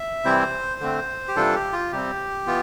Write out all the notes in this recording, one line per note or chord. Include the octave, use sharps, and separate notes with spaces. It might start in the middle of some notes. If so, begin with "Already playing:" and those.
Already playing: E5
C3 E3 G3 C4 E4 C5
D3 A3 C4
G4
C3 E3 G3 D4 F4 A4
G4
F4
C3 G3 C4 G4
E3 B3 F4